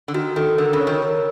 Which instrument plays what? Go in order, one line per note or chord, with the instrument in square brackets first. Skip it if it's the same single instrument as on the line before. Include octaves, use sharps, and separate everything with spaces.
[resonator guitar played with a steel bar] D3
[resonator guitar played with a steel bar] D#3 [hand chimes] F#4
[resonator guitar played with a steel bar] D#3 [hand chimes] A4
[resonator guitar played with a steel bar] D3 [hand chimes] A#4
[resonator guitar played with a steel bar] C#3
[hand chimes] C#5
[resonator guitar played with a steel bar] D#3
[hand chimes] A#4